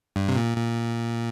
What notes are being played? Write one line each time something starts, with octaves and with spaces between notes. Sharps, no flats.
G2
C3
A#2
A#2